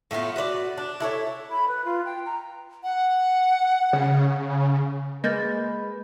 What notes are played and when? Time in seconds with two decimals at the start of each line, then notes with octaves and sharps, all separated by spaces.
0.11 A2 A3 B3 F4
0.36 F#4 B4 C#5 D5
0.78 D4
1.00 E4 A4 C#5
1.51 B5
1.68 B4
1.85 F4
2.05 G5
2.26 A#5
2.83 F#5
3.93 C#3
5.24 G#3 A#3 B4 D#5 G6 A6